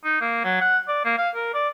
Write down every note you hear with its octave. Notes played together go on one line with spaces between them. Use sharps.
D#4
A#3
F#3
F#5
D5
A#3
F5
A#4
D5